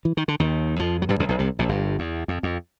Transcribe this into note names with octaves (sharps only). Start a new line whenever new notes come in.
E3
D#3
D3
D#2 D#3
F2 F3
F#3
G2 G3
C#2 C#3
B1 B2
C2 C3
A#1 A#2
G1 G2
E2
F2
F2